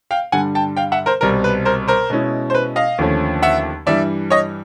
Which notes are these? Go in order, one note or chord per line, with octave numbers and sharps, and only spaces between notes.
F5 G5
G2 D3 G3 F#5 G#5
G5 A5
F5 G5
E5 F#5
A#4 C5
C2 B2 G3 C4 A#4
B4
A#4 C5
A#4 C5
B2 G#3 C#4 E4
C5
B4
D#5 F5
D#2 D3 F3 A3 C#4
E5 F#5
G2 E3 G3 D5 E5
C#5 D#5